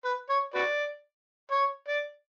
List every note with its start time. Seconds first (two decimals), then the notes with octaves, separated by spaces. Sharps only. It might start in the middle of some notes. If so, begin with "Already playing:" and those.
0.05 B4
0.29 C#5
0.54 F#4 B4 D5
1.51 C#5
1.88 D5